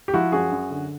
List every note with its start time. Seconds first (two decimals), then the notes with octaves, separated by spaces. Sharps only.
0.08 G4
0.14 F3 E4 F#4
0.32 F#2 F#4 G#4
0.51 F#2
0.71 D3